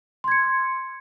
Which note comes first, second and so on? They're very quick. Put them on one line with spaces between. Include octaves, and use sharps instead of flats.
C6 G#6 C#7